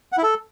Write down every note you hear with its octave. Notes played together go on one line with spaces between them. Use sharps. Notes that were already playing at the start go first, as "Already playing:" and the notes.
F#5
E4
A4